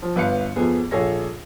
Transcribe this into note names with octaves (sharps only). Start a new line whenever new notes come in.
F3
G1 B4 F5 C#7
F2 B3 G#4
A#1 G#4 A4 C#5 A#6